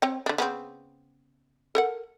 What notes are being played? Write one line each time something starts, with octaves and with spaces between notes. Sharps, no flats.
C4 C#5 G5
D3 D4
C#3 B3 C4
A4 A#4 F#5